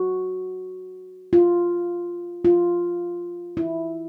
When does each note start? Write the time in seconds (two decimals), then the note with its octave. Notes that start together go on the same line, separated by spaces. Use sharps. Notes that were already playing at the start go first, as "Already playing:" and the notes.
Already playing: F#4
1.33 F4
2.45 F4
3.57 E4